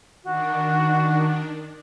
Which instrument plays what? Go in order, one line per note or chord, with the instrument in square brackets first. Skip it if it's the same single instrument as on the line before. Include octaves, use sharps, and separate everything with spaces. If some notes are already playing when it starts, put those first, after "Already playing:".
[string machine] D#3 D4 [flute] F#4